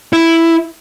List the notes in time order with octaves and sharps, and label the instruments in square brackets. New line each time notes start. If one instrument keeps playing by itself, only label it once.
[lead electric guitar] E4